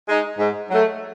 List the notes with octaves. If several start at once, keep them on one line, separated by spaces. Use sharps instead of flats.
G#3 D#4
G#2
F#3 A3